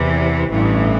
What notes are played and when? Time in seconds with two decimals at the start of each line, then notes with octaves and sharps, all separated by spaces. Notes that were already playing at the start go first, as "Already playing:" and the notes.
Already playing: E2 C3 E3
0.48 A1 G2 E3